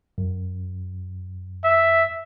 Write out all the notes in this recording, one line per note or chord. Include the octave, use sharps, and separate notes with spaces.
F#2
E5